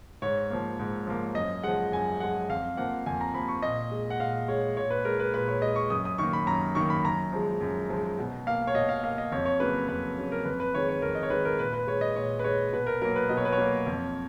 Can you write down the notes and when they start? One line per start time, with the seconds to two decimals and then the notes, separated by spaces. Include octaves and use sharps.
0.22 G#2 C#5
0.50 F3 A#3
0.79 G#2
1.07 F3 A#3
1.35 F#2 D#5
1.63 F3 G#3 F#5
1.92 F#2 G#5
2.20 F3 G#3 F#5
2.49 F2 F5
2.77 F3 A#3 F#5
3.06 F2 G#5
3.21 A#5
3.34 F3 A#3 B5
3.48 C#6
3.62 A#2 D#5
3.91 G#3
4.10 F#5
4.20 A#2 F5
4.48 G#3 C#5
4.77 A#2 C#5
4.90 B4
5.05 G#3 A#4
5.19 B4
5.34 A#2 B4
5.48 C#5
5.62 G#3 D#5
5.76 C#6
5.90 F#2 D#6
6.05 D#6
6.18 D#3 A#3 C#6
6.33 B5
6.47 F#2 A#5
6.75 D#3 A#3 C#6
6.90 B5
7.04 F#2 A#5
7.32 F3 G#3
7.61 F#2
7.89 F3 G#3
8.18 B2
8.47 A#3 F5
8.67 C#5
8.75 B2 D#5
8.89 F5
9.03 A#3 F5
9.18 D#5
9.32 F2 C#5
9.45 C#5
9.60 C#3 F#3 A#3 B4
9.88 F2 B4
10.18 C#3 F#3 A#3
10.32 A#4
10.45 F2 B4
10.60 B4
10.74 D#3 G#3 C#5
10.88 C#5
11.02 F2 A#4
11.15 D#5
11.23 C#5
11.30 D#3 G#3 B4
11.45 A#4
11.59 A#2 B4
11.73 B4
11.87 G#3 C#5
12.01 D#5
12.15 A#2 C#5
12.39 B4
12.44 G#3 C#5
12.73 B2 B4
12.86 A#4
13.02 F#3 A#3 A#4
13.16 B4
13.29 B2 D#5
13.37 C#5
13.45 B4
13.52 C#5
13.58 F#3 A#3
13.86 F2